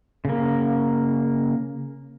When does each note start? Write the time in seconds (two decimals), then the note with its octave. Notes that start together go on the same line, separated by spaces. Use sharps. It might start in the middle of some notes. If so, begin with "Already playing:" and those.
0.25 C#3 A#3